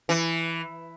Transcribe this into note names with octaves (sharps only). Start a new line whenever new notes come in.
E3